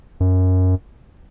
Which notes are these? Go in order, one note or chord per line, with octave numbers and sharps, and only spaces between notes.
F#2